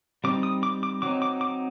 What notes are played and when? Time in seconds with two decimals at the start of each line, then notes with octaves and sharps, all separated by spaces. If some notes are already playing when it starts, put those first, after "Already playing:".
0.24 G3 C4 D#4 D6
0.43 D#6
0.63 D6
0.83 D6
1.02 F#3 C4 D#4 D6
1.22 D6
1.41 D6